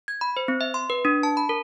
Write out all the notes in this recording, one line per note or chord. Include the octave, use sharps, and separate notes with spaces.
G#6
B5
C5
C4
E5
C6
B4
D4
A5
B5
A#4